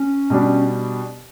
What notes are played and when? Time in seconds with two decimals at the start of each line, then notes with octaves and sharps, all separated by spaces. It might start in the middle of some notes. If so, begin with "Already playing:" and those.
Already playing: C#4
0.30 B2 G3 D4 G4